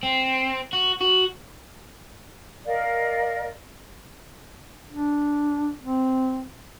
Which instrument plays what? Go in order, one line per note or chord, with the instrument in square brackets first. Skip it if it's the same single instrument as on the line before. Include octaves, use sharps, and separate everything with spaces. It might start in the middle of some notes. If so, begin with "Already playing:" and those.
[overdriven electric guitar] C4
F#4
F#4
[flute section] A#4 D5 D#5 F5
[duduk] D4
C4